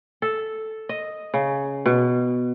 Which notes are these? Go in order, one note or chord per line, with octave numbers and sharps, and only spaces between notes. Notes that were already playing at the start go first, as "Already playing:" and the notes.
A4
D#5
C#3
B2